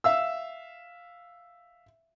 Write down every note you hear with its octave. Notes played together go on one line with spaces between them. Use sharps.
E5 F5 E6